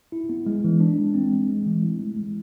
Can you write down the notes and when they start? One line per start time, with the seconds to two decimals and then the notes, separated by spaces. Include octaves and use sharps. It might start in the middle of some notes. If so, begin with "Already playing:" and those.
0.12 E4
0.29 B3
0.46 G#3
0.64 E3
0.81 D4
0.98 G#3
1.14 C4
1.32 G#3
1.49 G#3
1.66 E3
1.83 E4
2.00 A3
2.17 G#3